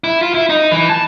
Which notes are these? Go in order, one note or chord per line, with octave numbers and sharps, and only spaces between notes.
E4
F4
E4
D#4
E3
A5